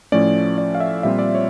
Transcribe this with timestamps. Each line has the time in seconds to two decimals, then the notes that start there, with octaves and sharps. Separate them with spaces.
0.12 A2 F3 A3 C#4 D5
0.58 D5
0.75 F5
0.80 E5
1.03 A#2 G3 C4 F4 E5
1.19 D5
1.35 C#5